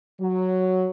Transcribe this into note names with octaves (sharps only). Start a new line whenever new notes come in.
F#3